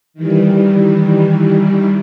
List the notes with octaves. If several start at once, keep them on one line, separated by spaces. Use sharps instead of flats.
D#3 E3 G3